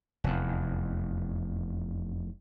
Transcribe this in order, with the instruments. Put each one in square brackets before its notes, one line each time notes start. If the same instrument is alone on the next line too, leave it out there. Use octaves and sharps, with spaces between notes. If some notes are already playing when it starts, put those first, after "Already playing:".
[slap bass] F1 E2